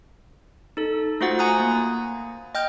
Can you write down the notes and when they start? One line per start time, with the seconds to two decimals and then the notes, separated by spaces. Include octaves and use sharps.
0.77 D#4 A4
1.21 A3 F4 F#4 C5 F#5 A6
1.39 F#5 G#5 A#5 D#6 F#6
1.60 A#3
2.55 D#5 G5 F6 G6